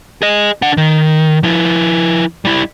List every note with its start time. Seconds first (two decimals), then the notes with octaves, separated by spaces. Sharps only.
0.22 G#4 D#5
0.62 D4 F#5
0.77 D#3
1.43 F3 E4
2.45 G3 E4